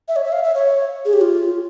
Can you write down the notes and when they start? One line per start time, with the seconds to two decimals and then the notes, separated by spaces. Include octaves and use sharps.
0.08 E5
0.16 C#5
0.25 E5
0.32 F5
0.44 E5
0.55 C#5
1.05 G#4
1.13 G4
1.21 F4